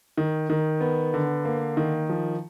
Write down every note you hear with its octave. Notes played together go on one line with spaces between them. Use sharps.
D#3
D#3
B3
D3
A#3
D#3
F3